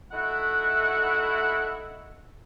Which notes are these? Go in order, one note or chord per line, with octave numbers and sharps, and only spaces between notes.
A3 D#4 E4 F#4 E5 F#5